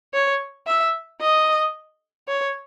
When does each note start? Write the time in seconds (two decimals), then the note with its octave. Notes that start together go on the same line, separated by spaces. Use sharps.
0.13 C#5
0.67 E5
1.21 D#5
2.28 C#5